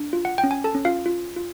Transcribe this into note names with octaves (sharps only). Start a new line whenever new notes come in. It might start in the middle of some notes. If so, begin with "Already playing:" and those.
Already playing: D4
F4
F#5
G5
C#4
G#5
A4 A5
C#4
F4 F5
F4
F4